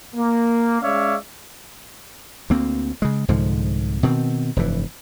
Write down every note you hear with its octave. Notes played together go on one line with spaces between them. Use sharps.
A#3
G#3 C#4 C#5 D5 E5 F5
D2 A#3 C4
C#3 G#3
C2 G#2 D3 F3
B2 D#3 C4
F1 G2 E3